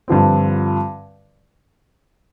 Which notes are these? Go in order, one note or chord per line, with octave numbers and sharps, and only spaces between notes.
G2 D3 F3 C4